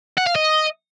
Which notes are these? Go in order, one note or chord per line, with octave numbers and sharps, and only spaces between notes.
F#5
F5
D#5